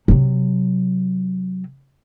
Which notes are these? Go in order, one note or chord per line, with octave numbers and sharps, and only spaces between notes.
C3 F#3